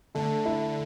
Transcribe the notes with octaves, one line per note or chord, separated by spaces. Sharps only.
D3 A3
E4